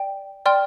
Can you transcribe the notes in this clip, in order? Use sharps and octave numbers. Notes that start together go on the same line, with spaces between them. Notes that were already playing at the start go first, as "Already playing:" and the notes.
Already playing: D5 G5
D5 G5 C6 F6